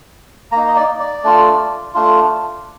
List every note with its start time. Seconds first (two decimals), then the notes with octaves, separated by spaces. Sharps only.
0.52 A#3 A#5
0.56 D#4
0.68 D#5
0.76 D5
1.00 D5
1.24 A3 D4 F4
1.94 A3 D4 F4